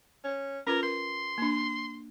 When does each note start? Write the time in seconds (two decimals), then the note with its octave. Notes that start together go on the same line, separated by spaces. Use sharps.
0.24 C#4
0.67 C#4 F4 A#4 B4
0.83 A#4 C6
1.38 A#3 D4